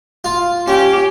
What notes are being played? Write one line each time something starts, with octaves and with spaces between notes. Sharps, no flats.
F4
C#4 G4